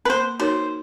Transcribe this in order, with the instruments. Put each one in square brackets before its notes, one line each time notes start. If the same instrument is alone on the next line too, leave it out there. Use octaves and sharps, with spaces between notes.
[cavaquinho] B4
[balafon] A#3 [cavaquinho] C5
[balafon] D#4 F#4 A#4 C#5 [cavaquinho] C5